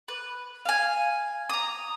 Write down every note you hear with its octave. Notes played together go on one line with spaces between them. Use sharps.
B4
F5 G#5
A#5 D#6